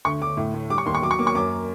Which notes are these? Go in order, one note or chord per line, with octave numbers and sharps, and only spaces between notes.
D2 C#6
D2 D6
A2
A3
G3 D6
C#6
D#2 C6
C#6
F#3 D6
C#6
A#3 D6
C#6
F#2 D6